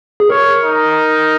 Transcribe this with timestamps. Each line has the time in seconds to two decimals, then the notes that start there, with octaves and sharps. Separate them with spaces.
0.20 G#4
0.29 A#4 C#5
0.63 D#4